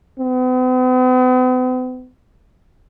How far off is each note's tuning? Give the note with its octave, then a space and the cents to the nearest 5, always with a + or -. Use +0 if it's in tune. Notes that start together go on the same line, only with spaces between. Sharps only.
B3 +45